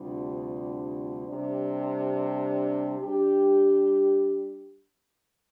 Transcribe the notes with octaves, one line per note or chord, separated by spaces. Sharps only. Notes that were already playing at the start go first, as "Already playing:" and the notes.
Already playing: D2 C3 G3 D4 F4
C3 G3 D4
G3 D4 G4